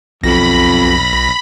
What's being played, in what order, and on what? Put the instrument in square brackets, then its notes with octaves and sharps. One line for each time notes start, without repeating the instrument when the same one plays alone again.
[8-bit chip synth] B1 A#6 [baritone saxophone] F2 [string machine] B5